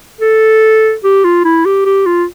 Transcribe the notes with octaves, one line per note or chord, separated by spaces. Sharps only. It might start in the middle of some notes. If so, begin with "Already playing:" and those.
A4
G4
F4
E4
G4
G4
F4